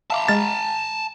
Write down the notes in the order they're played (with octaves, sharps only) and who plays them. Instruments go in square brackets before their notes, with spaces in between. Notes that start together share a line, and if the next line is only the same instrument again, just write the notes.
[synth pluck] E5 F5 D6 [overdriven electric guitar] A5 A#5
[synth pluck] G#3 F6 [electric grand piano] A6